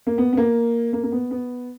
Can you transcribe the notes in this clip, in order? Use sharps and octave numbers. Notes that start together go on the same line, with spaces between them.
A#3
B3
B3
A#3
A#3
A#3
B3
B3